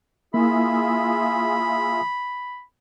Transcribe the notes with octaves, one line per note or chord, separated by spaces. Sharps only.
A#3 E4 F4 G#4 E5 B5